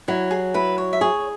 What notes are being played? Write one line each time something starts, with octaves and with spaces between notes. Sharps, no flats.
F#3 E4
G#4
E4 B4
C#5
E5
G#4 C#5